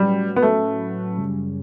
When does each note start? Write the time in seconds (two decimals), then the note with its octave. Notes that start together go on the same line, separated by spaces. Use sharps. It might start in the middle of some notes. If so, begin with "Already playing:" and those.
Already playing: A2 F#3 G3 C#4 F#4 B4
0.36 B3
0.42 A3
1.17 F#2 C#3 G3 C#4